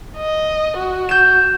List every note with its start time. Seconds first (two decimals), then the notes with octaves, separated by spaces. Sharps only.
0.17 D#5
0.77 F#4
1.09 G6 E7